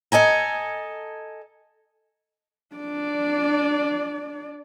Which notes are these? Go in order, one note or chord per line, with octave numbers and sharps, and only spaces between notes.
A4 D#5 G#5 A#5
D4 D5